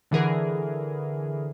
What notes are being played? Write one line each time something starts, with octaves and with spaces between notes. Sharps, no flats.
D3 E3 G#4 A#4